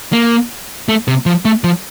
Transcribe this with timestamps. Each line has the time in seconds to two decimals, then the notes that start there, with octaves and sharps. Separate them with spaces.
0.13 A#3
0.89 A3
1.08 C3
1.26 F3
1.45 A3
1.64 F3